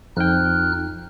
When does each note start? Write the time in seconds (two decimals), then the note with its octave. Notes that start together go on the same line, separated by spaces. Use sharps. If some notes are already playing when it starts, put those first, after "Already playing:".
0.17 F2 D#4 G5 F6 F#6